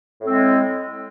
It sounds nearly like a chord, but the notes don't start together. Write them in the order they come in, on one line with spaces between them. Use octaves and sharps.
A2 C4 G#3